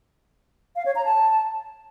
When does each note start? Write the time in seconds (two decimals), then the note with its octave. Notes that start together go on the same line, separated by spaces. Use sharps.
0.76 F5
0.86 C#5
0.96 A#5
1.05 A5